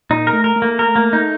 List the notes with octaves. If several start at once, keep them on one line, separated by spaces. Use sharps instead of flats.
A#2 D#4
A#4
A3
A#4
A3
A#3
A#4
A#3
D#4